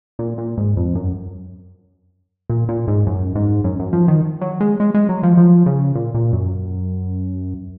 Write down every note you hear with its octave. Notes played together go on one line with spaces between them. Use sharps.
A#2
A#2
G#2
F2
F#2
A#2
A#2
G#2
F#2
G#2
F#2
F#2
F3
D#3
F#3
G#3
G#3
G#3
F#3
F3
F3
C#3
A#2
A#2
F#2